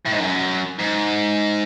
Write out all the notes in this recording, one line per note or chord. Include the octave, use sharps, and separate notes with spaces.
A2
G#2
F#2
G#2